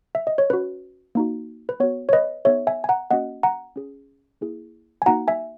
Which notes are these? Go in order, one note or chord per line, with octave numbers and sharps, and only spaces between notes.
E5
D#5
C#5
C#4 F#4 B4
A#3 D#4 F#4
B4
B3 F#4 C#5
C#5
B4 D#5
B3 D#4 G#4 C#5 E5
E5 G#5
G#5
F#5 A#5
A#3 C#4 F#4 D#5 F#5
F#5 A#5
C#4 G#4
A#3 E4 G#4
G#5
A#3 D#4 F#4 F#5 A#5
E5 G#5